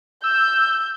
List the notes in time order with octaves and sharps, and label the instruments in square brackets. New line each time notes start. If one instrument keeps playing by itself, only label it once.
[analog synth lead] E6 [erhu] G6